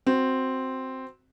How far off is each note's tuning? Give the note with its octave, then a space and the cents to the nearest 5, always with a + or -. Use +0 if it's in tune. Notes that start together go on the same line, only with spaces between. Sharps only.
C4 +0 F#4 +0